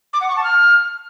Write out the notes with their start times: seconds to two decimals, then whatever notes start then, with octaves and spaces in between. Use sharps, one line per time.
0.13 D6
0.21 F#5
0.29 C#6
0.36 A5
0.44 F6